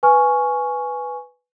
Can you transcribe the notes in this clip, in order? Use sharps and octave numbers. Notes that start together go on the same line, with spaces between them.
B4 G#5 C#6 F6